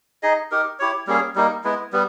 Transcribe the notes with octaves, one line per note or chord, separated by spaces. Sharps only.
D#4 G#4 D#5
D#4 G4 A#4
E4 G4 C#5
G3 A#3 C#4 G#4
G3 A#3 D#4
G#3 B3 E4
G3 B3